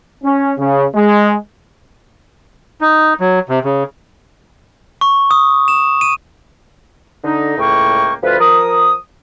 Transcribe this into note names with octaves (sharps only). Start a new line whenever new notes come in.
C#4
C#3
G#3
D#4
F#3
C3
C#3
C#6
D#6
E7
D#7
D3 D#4
C#2 A2 A#3 G5 C#6
D2 F3 F4 B4
F3 A#4 D#6